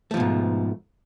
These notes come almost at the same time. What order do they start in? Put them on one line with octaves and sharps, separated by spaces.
A3 F3 B2 G#2